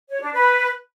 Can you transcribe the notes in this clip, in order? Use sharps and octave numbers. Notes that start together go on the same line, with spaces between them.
C#5
D4
B4